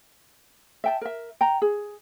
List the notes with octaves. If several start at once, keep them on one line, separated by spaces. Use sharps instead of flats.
E5 G5 A5
A#4 E5
G5 A#5
G#4